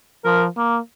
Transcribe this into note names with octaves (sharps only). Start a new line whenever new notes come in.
F3 A#4
A#3